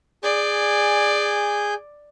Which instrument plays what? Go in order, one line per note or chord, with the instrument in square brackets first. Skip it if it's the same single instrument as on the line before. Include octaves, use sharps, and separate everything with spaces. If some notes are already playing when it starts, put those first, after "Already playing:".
[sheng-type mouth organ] G#4 G#5 G6 [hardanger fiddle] D5